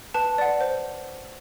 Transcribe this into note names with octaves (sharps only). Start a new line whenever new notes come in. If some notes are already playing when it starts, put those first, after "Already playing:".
B4 A5
D5 F#5
C5